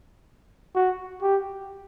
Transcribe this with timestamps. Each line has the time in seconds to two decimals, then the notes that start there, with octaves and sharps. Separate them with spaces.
0.75 F#4
1.22 G4